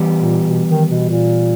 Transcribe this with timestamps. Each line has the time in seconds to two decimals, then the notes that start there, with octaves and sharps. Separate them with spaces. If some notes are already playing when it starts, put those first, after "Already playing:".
Already playing: E3 G3 B3 G4
0.19 A#2
0.47 B2
0.69 D#3
0.90 B2
1.10 A#2